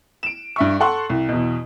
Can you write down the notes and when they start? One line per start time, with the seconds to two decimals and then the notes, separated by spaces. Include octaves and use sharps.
0.23 D7 E7
0.56 G2 E5 C#6
0.80 A4 F#5 C6 C#6
1.09 C2
1.29 E2 B2